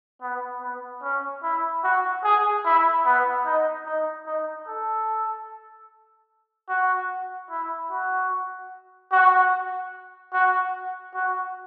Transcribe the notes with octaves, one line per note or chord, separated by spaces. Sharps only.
B3
B3
C#4
E4
F#4
G#4
E4
B3
D#4
D#4
D#4
A4
F#4
E4
F#4
F#4
F#4
F#4